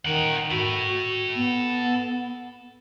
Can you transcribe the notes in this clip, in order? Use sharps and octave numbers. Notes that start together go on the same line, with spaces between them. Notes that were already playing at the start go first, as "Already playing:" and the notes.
D#3 A#4 F#5
F#4 A4 B5
B3